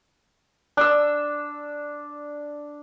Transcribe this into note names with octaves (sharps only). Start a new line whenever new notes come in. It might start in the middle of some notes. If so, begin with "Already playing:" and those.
D4 E6